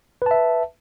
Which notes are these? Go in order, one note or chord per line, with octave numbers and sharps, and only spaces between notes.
B4 E5 A5